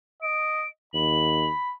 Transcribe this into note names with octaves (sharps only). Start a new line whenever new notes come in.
D#5 D7
D#2 B5 F#7